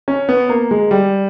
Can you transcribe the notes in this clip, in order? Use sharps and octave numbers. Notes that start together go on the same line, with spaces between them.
C#4
B3
A#3
G#3
G3